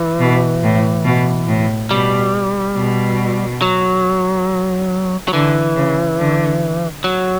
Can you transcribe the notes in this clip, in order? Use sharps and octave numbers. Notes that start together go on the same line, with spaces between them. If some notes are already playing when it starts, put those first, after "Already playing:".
Already playing: E3
B2
A2
B2
A2
B2 G3
B2
F#3
F#3
D3 E3
C#3
D3
F#3